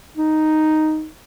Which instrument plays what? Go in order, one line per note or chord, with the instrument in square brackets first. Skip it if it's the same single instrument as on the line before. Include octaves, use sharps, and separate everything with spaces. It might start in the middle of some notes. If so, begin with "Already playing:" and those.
[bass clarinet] D#4